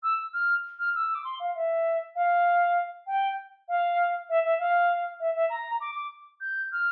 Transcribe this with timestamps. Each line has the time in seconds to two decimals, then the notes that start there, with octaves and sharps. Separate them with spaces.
0.03 E6
0.33 F6
0.78 F6
0.94 E6
1.14 D6
1.24 C6
1.39 F5
1.55 E5
2.15 F5
3.06 G5
3.68 F5
4.29 E5
4.43 E5
4.59 F5
5.20 E5
5.34 E5
5.49 A#5
5.80 D6
5.95 D6
6.40 G6
6.72 F6